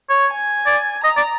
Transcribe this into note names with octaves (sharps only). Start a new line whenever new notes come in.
C#5
G#5
D5
D#5 A#5
D5